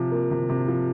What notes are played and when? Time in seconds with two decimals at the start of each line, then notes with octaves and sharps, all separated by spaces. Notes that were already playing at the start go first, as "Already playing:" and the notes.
Already playing: C3 F3
0.12 A#3
0.31 C3
0.49 C3
0.68 F3